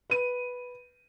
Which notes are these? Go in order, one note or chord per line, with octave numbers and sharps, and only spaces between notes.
B4 D#7